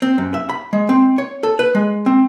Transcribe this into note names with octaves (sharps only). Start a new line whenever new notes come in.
C4
F#2
E5
B5
G#3
C4
C#5
A4
B4
G#3
C4